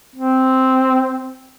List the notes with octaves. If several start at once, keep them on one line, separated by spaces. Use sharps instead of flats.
C4